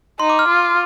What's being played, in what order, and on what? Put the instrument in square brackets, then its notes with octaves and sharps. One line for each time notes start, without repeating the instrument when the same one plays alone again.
[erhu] D#4 [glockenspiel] C6
[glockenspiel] D6
F6
[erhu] F4